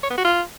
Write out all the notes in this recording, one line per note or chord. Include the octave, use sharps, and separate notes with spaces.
C#5
B3
F#4
F4